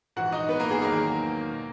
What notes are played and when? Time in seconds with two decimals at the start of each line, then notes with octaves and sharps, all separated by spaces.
0.16 A#1 G#2 E3 F#4 F#5
0.32 D#4 D#5
0.49 B3 B4
0.60 A#3 A#4
0.71 G#3 G#4
0.82 E2 D#3 F#3 A#3 A#4
1.50 B2